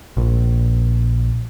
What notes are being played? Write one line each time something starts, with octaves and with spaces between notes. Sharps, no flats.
A#1